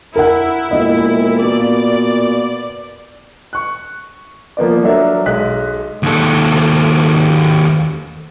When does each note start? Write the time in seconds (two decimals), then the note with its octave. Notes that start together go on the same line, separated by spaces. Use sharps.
0.16 E4 A#4 F#5
0.71 E1 A#2 D#5
1.42 B2 D5
3.53 C#6 F#6
4.57 F3 A#3 B3 D5
4.83 F#3 D4 A4 A#4 E5
5.26 B1 G#3 F#6 B6
6.03 D#2 A4